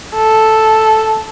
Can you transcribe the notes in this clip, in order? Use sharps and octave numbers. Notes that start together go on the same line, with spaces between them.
A4